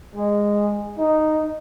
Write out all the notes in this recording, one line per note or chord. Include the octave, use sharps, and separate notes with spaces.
G#3
D#4